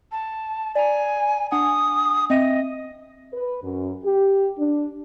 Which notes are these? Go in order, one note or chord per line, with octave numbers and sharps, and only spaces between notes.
A5
D5 G#5 A#5
D4 F#5 G#5 D#6
C4 D#5 E5 D#7
B4
F#2
G4
D4